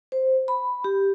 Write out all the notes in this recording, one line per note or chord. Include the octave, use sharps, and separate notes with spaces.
C5
B5
G4